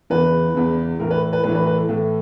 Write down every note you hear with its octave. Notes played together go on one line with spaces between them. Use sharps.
E2 C#3 E3 B4
E2 C#3 E3
A2 E3 A#4
B4
B4
A2 E3 B4
B4
B4
A4
A2 E3 A4